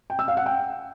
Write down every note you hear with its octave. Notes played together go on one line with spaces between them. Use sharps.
G5
E6
F5
F#5
G5